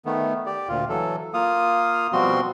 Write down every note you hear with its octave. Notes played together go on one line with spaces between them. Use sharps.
D#3 A3 B3
G4 D5
D2 A#2 F4
E3 F#3 A4
A#3 F4 F5 D#6
B2 F3 G3 C4 F#4 C6